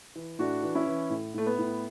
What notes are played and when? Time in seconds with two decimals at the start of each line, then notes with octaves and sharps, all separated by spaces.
0.15 E3
0.39 A2 D4 F#4
0.63 E3
0.75 C#4 E4
0.86 E3
1.10 A2
1.34 A2 A3
1.46 B3
1.58 A2